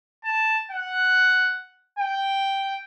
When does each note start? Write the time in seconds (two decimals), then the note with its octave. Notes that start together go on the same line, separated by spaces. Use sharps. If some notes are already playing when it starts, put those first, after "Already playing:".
0.24 A5
0.71 F#5
1.99 G5